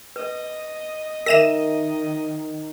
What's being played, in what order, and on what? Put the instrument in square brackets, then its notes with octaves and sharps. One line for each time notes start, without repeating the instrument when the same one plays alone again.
[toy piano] B4 [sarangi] D#5
[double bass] D#3 [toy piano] A#4 E5 [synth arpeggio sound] A#6 D#7 E7